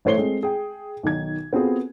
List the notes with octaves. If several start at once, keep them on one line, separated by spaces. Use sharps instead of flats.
A1 A3 C5 C#5 C7 G7
G#3 C4 A4
G#4 G5
B1 D#3 G#6
B3 C4 F4 F#4 G#4 A4